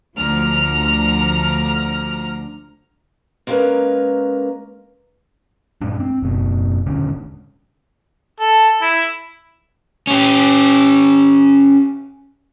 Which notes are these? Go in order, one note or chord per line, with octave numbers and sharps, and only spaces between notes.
D2 D3 F3 A#5 F6
G#3 A#3 B3 C#4 A#4 B4
G2 A#2 G#3 D4
C4
F#1 B2
D#1 G#2 D3 C#4
A4
E4
C#4 G4